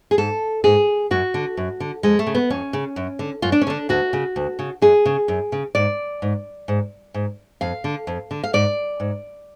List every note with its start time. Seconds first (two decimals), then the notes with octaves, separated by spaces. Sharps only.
0.11 G#4
0.18 G#2 A4
0.64 G#2 G#4
1.11 F#2 F#4
1.34 D3
1.57 F#2
1.80 D3
2.03 F2 G#3
2.19 A3
2.27 C#3
2.35 B3
2.50 F2 C#4
2.73 C#3
2.96 F#2
3.19 D3
3.42 F#2 F4
3.52 D4
3.61 C#4
3.67 D3 D4
3.89 D2 F#4
4.13 C#3
4.36 D2
4.59 C#3
4.82 F#2 G#4
5.05 C#3
5.28 F#2
5.52 C#3
5.75 G#2 D5
6.22 G#2
6.68 G#2
7.14 G#2
7.61 F2 F5
7.84 D3
8.07 F2
8.31 D3
8.44 F5
8.53 G#2 D5
9.00 G#2